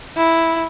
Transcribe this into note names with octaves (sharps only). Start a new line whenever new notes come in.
E4